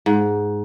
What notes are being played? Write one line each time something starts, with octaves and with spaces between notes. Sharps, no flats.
G#2